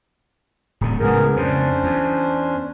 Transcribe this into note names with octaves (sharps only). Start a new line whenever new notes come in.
D1 D3
C#2 A2 B3 G#4 A#4
F2 C#3 C#4 D4 C5
E2